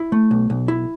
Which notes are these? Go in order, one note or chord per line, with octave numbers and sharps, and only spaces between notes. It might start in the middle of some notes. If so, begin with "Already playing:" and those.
Already playing: E4
A3
B1
B1
E4